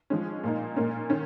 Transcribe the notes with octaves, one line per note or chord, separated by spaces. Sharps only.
F3 G#3 C#4
A#2 A#3 D#4
A#2 A#3 C#4
D#3 C#4